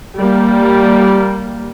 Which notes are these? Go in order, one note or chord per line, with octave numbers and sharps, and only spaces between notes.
G3 A#3